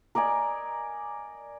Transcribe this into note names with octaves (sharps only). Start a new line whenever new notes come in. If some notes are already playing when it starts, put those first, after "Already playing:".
A#4 D5 D#5 G#5